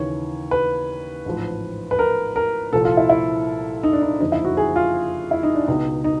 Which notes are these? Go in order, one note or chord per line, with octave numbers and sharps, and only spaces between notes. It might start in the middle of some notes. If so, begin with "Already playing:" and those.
Already playing: D#2 C#3 E3 C#5
B4
A1 G#2 F3
B4
A#4
A#4
C2 A#2 F3 A4
F4
E4
E4
D#4
D4
D#4
F#1 F2 D3 F3 D#4
E4
F#4
G#4
F4
E4
D#4
D4
C#2 B2 D#4
D#4